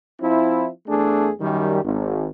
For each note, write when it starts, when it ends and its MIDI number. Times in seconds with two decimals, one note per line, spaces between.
0.22 0.68 53
0.22 0.68 60
0.22 0.68 64
0.88 1.30 40
0.88 1.30 57
0.88 1.30 62
0.88 1.30 68
1.40 1.80 42
1.40 1.80 51
1.40 1.80 55
1.84 2.28 32